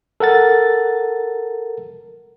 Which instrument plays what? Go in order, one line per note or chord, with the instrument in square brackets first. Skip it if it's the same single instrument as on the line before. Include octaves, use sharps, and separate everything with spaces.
[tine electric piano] A4 A#4 F#5 A6